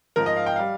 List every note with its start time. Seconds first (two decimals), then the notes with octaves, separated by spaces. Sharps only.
0.16 G#2 F3 A#4
0.26 D#5
0.36 F5
0.46 G5
0.56 G3 F5